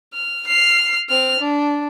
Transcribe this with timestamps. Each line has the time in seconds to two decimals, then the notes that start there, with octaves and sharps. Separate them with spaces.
0.13 F6
0.47 F6 C7
1.09 C4 F6
1.40 D4